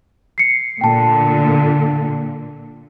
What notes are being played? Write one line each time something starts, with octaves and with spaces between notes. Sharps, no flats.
C7 C#7
A#2 D3 G5 A5